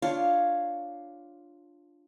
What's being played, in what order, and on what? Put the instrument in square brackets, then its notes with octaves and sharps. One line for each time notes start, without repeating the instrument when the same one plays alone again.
[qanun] D4 F4 C#5 F5